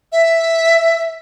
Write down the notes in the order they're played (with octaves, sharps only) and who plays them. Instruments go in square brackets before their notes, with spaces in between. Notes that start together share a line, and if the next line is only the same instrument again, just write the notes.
[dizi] E5